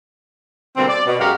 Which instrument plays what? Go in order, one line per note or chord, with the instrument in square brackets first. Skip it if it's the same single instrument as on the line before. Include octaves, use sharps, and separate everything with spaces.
[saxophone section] B2 D3 G3 A#3 C4
D5
B2
F#2 G#3 F#4 G4 A#4 F5